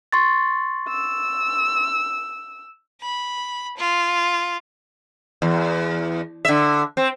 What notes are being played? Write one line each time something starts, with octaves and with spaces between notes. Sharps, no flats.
C6 C#6 A6
E6
B5
F4
E2
D3 E5
C4